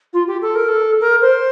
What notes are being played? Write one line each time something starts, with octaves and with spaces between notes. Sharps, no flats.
F4
G4
A4
A#4
A4
A#4
C5